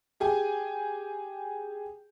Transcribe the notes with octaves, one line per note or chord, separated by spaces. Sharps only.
G4 G#4 G#5